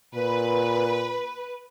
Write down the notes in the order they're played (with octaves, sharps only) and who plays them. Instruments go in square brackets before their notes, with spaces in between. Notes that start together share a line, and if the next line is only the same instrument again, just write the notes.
[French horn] A#2 [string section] B4